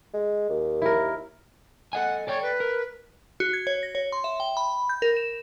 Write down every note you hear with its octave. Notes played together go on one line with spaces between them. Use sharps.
G#3
D#2
E4 A#4
A4 D#5 F#5 G#5
A4 C#5 D5 G5
B4
A#4
F#4
G#6
C#5
A#6
C#5
C6
E5
G5
B5
G6
A#4
E7